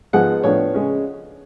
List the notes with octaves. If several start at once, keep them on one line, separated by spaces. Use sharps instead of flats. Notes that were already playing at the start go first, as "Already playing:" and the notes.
G#2 F3 G#3 B3 F#5
A2 F3 B3 D4 C#5
C#3 G#3 C#4